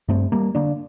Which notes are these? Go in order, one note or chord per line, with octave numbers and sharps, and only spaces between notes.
G2 A3 C4
G3 A#3
D3 A#3 D4